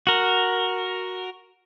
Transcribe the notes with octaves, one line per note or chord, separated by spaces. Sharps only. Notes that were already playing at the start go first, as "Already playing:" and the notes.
F#4 A#4